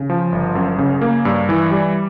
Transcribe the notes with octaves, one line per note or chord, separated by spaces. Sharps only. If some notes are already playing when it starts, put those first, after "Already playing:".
Already playing: C#3
F3
G1
F#2
C#3
A#3
G2
E3
G3